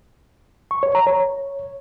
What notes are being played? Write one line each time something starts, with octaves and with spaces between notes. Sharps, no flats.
C#6
C#5
A#5
C#5